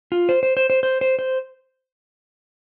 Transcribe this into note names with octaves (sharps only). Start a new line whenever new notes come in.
F4
C5
C5
C5
C5
C5
C5
C5